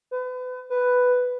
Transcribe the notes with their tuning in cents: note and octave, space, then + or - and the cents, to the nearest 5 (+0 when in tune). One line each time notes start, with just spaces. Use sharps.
B4 +35
B4 +5